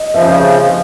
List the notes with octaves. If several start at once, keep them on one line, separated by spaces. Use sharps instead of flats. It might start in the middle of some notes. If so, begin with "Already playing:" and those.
Already playing: D#5
C#3 F3 E5